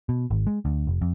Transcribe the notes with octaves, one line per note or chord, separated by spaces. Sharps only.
B2
G#1
G#3
D2
F1
F2